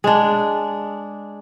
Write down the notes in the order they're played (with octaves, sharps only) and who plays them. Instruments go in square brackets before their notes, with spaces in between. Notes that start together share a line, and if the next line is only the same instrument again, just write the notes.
[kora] G#3 D4